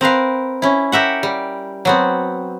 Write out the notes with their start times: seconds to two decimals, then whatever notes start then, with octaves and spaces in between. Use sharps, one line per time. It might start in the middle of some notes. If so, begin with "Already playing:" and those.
0.01 C4 A#4 B4 F5
0.62 C#4 E4
0.92 G4 A#4 E5 F#5
1.23 G3
1.85 F#3 B3 C4